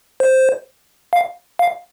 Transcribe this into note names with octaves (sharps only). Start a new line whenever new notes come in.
C5
F5
F5